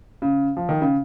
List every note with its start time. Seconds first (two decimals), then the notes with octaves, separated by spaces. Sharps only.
0.22 C#3
0.57 F3
0.69 D#3
0.81 C#3